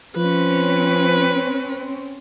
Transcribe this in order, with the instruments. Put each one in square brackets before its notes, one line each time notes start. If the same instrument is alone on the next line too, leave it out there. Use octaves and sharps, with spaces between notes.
[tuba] F3 [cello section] C4 C#4 [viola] B4